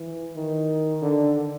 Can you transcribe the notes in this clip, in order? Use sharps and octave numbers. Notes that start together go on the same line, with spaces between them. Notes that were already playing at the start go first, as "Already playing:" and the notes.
Already playing: E3
D#3
D3